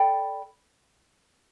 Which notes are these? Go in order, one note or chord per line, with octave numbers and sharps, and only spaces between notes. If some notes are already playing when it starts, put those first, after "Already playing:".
Already playing: A4 D5 G5 B5